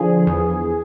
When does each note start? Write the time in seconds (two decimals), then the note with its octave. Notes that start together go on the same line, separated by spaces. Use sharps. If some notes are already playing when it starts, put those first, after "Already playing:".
Already playing: D3 F3 G#4
0.27 E2